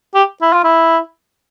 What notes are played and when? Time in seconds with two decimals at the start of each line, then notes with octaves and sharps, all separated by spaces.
0.15 G4
0.41 E4
0.53 F4
0.64 E4